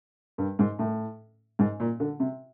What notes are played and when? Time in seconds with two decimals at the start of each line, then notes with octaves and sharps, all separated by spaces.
0.38 G2
0.59 G#2
0.79 A2
1.59 G#2
1.80 A#2
2.00 D3
2.20 C3